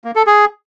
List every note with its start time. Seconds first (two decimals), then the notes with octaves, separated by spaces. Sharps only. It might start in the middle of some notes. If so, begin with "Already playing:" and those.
0.04 A#3
0.15 A4
0.27 G#4